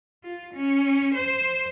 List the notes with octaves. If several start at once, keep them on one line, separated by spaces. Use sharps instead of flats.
F4
C#4
C5